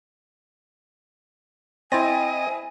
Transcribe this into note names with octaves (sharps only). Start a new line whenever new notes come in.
C4 E4 D#5 G#5 A6 A#6